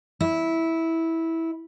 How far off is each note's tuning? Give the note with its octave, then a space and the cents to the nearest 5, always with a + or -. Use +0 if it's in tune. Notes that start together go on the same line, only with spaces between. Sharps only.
E4 -10